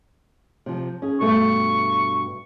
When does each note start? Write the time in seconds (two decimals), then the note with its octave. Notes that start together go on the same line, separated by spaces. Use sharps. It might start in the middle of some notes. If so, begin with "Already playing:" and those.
0.66 C3 F3
1.02 C#4 G#4
1.20 G2 B2 A3 C#6